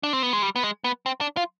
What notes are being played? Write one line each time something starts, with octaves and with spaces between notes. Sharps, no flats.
D4
C4
B3
G#3
G3
B3
G#3
B3
C4
D4
F4